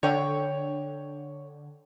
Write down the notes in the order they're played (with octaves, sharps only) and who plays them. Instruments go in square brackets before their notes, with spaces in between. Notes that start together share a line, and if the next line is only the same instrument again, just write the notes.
[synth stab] D3 [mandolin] C#5 G5